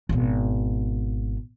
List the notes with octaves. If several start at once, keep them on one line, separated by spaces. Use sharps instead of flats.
G#1 B2